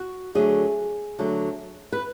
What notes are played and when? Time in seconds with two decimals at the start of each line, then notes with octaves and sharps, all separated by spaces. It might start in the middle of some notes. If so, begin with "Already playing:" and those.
Already playing: F#4
0.35 D3 F#3 A3 G#4
1.19 D3 F#3 A3
1.93 B4